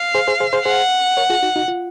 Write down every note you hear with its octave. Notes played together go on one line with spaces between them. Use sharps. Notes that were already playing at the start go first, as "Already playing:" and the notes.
Already playing: F5
G#4 C5
G#4 C5
G#4 C5
G#4 C5
G#4 C5 F#5
A#4 C#5
F4 G#4
D#4 F#4
D#4 F#4
F4